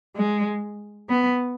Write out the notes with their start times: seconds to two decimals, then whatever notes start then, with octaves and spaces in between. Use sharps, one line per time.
0.17 G#3
1.09 B3